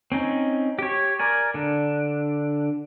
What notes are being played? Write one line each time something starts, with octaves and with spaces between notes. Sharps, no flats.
C4 C#4 D#4
G4 C#5
A#4 D5 G#5
D3 D4